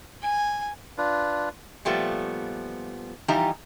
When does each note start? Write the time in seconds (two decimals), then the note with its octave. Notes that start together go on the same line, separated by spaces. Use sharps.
0.22 G#5
0.98 D4 F4 B4
1.85 A#2 F3 G3 A3 B3
3.28 E3 F3 G3 D#4 G4 A#5